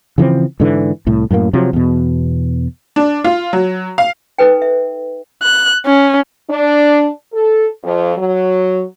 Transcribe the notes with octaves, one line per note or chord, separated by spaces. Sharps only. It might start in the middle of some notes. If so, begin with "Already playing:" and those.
C#3 E3 F3 C4
G#2 D3 E3
C2 A2
F#2 A2 G#3 A#3
C3 F3 F#3
E2 B2
D4
F4
F#3
F5
D#4 A4 B4 G5
E5
F#6
C#4
D4
A4
F2
F#3